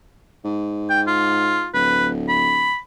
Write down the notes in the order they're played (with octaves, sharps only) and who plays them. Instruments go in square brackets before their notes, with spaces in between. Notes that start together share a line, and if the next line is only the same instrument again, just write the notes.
[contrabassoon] G#2
[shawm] G5
F4
[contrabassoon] D1 [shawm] B4
[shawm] B5